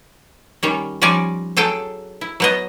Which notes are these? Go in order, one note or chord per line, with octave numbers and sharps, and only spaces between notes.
D#3 G3 C#4
F3 G3 C#4 D#4 D5 G#5
F#3 G#4 A4 G5 A5
E4
F#3 B3 D#5